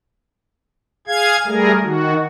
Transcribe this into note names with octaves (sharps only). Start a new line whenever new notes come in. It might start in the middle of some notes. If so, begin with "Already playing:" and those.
G#4 F5 G#6
G3 A3 G#4 A#4
D#3 F#4